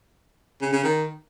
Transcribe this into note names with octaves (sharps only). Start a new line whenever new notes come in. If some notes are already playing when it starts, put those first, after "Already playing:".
C#3
C#3
D#3